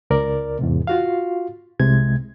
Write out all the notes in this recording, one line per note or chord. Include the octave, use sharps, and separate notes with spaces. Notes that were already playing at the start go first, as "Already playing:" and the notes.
C#2 A#4 D5
E2 G#2 C3
F4 F#4 F5
C2 C3 G#3 G#6